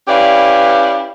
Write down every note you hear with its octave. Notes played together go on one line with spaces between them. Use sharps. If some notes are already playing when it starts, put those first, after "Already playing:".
C#4 E4 G4 B4 D5 F5